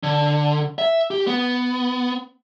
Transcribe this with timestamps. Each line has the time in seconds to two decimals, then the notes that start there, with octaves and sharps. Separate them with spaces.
0.03 D3
0.79 E5
1.11 G4
1.27 B3